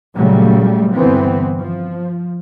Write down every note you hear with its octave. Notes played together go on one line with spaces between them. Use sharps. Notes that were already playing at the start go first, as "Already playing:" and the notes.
A#2 C#3 F#3 G3 A3
G2 D3 E3 B3 C4
F3